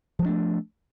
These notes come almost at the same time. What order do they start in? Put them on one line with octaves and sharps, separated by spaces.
F3 F#3 D4 A3